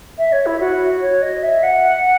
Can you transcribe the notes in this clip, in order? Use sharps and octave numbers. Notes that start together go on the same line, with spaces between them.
E5
C#5
E4
F#4
C#5
D#5
E5
F#5